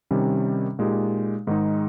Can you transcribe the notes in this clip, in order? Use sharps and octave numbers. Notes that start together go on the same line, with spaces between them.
C3 D#3 G3 C#4
A#2 G#3 D#4 G4
G#2 D#3 G#3 D#4